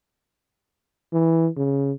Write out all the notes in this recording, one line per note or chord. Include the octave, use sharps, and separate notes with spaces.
E3
C#3